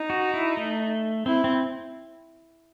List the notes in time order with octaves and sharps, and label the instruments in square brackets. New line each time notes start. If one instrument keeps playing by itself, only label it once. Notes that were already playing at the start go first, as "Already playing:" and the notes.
Already playing: [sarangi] D#4
[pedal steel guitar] F#4
E4
A3
[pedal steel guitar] C4 [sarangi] E4
[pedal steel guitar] C4